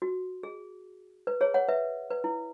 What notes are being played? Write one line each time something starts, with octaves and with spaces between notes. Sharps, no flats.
F#4
G#4
B4
G#4 C#5
C#5 F#5
B4 E5
B4
E4